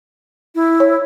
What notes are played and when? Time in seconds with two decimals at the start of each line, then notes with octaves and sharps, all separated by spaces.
0.55 E4
0.80 C#5